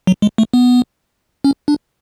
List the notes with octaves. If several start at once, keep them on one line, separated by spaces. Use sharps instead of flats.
F#3
G#3
A3
B3
C#4
D4